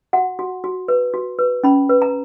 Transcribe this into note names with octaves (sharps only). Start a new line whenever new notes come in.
F#4 F#5
F#4
F#4
B4
F#4
B4
C#4 B5
B4
A#5